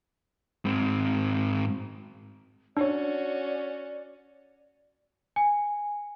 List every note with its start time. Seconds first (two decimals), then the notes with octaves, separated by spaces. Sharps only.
0.65 G#2 C4
2.77 C#4 D4 F#4 C#5 D5
5.36 G#5